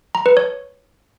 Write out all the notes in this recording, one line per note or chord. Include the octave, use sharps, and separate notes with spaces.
A#5
B4
C#5